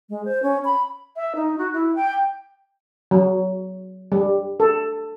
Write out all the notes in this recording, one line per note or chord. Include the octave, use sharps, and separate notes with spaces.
G#3
C5
C#4
B5
E5
D#4
F#4
E4
G5
F#3
G3
A4